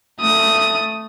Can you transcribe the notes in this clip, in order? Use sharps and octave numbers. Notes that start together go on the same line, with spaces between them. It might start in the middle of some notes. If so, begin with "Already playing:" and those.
A3 D#6